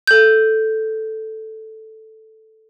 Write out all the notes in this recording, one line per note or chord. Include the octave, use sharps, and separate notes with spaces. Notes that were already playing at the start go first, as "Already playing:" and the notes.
A4 G6